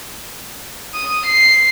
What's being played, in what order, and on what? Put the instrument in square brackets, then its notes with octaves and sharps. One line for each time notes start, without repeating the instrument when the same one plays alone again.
[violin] D#6
C7